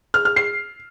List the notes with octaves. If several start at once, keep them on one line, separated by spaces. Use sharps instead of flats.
F6
F6
C7